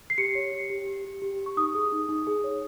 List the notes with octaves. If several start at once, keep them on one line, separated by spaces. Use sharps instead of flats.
C7
G4 C#7
C#5
G4
G4
G4
G4
G4
G4
C#6
D#4 D#6
G#4
D#4
D#4
G#4
C#5